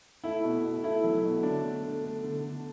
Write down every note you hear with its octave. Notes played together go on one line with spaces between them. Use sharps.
A3 E4
B2
B2
A3 E4
F#3
B2
D3 D4
A3
A3
A3
D3
D3